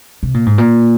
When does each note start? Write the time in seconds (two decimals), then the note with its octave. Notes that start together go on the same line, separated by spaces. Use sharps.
0.23 C3
0.34 A#2
0.46 G#2
0.58 A#2